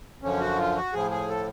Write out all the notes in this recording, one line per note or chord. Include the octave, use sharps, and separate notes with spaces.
F#2 D3 F3 C#4
F#4
F4
F#4
A2 F3 G#4
G#4
A4